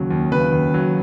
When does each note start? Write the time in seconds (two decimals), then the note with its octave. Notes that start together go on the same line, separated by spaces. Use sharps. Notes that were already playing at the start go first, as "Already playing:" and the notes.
Already playing: D#2 C#3 F#3
0.11 D#2
0.31 C#3 B4
0.52 D#2
0.74 F#3